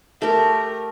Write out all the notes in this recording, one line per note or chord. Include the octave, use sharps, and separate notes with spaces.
A3 G4 A#4